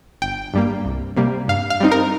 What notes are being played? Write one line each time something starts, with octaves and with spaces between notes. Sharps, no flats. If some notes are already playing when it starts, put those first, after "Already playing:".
G1 G5
G2 G3 A#3
C2
C3 G3 A#3
G2 F5
F5
G3 C4 D#4
A#4